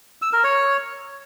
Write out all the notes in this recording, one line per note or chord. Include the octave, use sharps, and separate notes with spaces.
E6
A#4
C#5